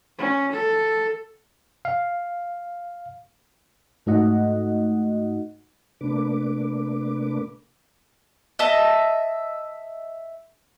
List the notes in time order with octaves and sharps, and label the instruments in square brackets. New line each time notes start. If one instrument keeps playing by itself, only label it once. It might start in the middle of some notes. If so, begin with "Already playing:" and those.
[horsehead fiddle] C#4
A4
[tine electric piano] F5
[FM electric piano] G#2 A3 D#4 F#4 D#5 F#5
[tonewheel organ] C3 A3 A#3 D4 B4 D6
[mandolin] D#5 E5 A5